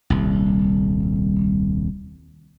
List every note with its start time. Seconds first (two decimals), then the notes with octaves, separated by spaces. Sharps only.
0.10 D#1 C2